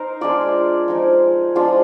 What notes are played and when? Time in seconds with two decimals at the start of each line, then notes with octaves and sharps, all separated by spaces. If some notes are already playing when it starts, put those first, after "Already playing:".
Already playing: D#4 A#4 C5
0.21 G#3 D4 F4 D5
0.88 F3 G#3 D#4
1.55 F3 G#3 D4 F4